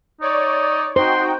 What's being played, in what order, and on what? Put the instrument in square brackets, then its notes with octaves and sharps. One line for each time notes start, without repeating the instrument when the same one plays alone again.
[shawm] D#4 [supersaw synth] C#5 D5
[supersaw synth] D#4 F#4 G5 [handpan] C5 [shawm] C6